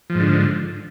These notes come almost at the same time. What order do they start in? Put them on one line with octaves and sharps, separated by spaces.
F3 G#2 D3